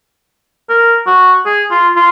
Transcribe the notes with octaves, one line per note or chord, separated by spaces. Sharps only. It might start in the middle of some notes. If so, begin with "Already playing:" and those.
A#4
F#4
G#4
F4
F4